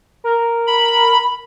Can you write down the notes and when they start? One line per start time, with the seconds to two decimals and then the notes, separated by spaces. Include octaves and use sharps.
0.24 A#4
0.67 B5